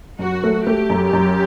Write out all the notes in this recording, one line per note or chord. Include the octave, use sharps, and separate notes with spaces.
F#2 F#4
A3
A3 G4
F#2
F#2